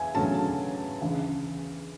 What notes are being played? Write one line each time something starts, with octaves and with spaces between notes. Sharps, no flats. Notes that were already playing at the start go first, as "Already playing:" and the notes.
Already playing: E2 E5 G#5
E2 D3 F#3 A3 C#4 A5
D2 C#3 E3